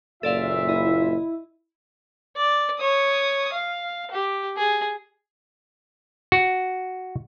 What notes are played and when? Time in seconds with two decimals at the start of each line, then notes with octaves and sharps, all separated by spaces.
0.23 F#1 A#2 F4 A4 D5 E5 F5
0.69 E4 D#5
2.36 D5
2.79 C#5 D#6
3.53 F5
4.11 G4
4.57 G#4
6.32 F#4